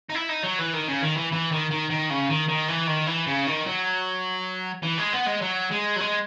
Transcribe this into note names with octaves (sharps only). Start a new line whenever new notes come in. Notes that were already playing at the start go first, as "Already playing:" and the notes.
D#4
E4
D#4
F#3
E3
D#3
C#3
D#3
E3
E3
D#3
D#3
D#3
C#3
D#3
D#3
E3
D#3
E3
C#3
D#3
F#3
E3
G#3
B3
G#3
F#3
G#3
F#3
G#3